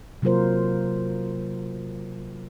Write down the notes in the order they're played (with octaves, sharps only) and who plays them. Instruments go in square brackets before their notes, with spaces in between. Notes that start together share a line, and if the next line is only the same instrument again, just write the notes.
[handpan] C3 F#3 A#3 F4 A#4 C5